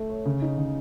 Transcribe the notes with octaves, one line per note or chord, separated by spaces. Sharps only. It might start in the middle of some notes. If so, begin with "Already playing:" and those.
Already playing: A3 A4
C#5
C#3
D#4
C#3